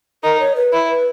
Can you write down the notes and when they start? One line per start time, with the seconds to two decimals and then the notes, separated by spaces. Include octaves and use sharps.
0.24 D#4 A#4
0.40 C#5
0.56 B4
0.73 E4
0.89 B4